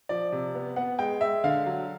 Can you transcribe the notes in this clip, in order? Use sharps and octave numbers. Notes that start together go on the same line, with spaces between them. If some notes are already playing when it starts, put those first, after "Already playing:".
F3 D5
C3
B3
B3 F#5
G#3 G5
G#3 E5
D3 F5
F#3